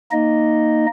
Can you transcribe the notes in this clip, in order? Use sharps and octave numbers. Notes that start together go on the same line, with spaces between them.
A#3 D#4 D#5